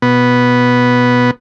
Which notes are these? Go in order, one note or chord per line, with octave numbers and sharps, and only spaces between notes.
B2 B3